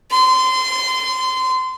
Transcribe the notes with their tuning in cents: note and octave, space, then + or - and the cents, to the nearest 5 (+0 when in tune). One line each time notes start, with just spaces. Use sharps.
C6 -25